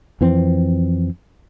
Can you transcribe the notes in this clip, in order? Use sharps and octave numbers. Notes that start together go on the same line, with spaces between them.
F2 E3 C4